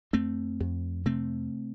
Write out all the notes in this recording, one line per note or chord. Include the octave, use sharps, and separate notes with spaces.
F2 A3 C4
F2
C3 A3 C4